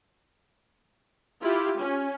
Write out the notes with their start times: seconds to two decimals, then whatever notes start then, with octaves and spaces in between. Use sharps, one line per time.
1.42 E4 F4 G4
1.79 C#4